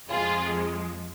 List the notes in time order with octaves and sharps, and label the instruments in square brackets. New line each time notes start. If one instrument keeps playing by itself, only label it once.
[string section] F2 F3 G#3 F4 G#4